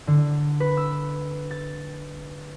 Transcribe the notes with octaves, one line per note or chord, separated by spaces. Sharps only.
D3
B4
E6
A6